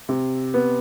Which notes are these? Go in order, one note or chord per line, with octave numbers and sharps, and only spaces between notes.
C3
B3